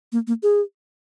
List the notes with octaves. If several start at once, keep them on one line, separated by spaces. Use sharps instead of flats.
A#3
A#3
G#4